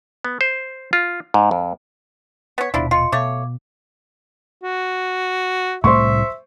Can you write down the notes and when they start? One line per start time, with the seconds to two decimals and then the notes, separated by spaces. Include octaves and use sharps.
0.25 B3
0.41 C5
0.93 F4
1.34 G#2
1.51 F2
2.58 B3 C#5 B6
2.74 D#1 B2 F3 D4 E4
2.91 F4 D#5 C6 C#7
3.12 B2 A3 C#5 F5 D6
4.63 F#4
5.84 C2 A2 A3 C5 E5 C6 C#6